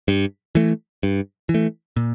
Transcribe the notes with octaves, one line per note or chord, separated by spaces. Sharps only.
G2
E3 A3
G2
E3
A3
A#2